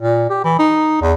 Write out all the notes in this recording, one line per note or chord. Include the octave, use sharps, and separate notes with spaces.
A#2
G4
E3
D#4
E2